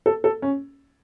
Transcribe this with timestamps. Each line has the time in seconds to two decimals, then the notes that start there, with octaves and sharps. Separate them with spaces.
0.06 A4
0.24 A4
0.42 C#4